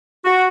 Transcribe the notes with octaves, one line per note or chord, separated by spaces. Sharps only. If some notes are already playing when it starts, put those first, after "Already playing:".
F#4